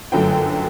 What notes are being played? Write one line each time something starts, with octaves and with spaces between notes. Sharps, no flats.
G1 F#2 D3 F#3 A3 G5